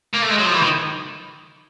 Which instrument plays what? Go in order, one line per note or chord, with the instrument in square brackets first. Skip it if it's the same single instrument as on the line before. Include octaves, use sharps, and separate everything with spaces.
[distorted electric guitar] A#3
A3
G#3
F#3
F3
E3
D#3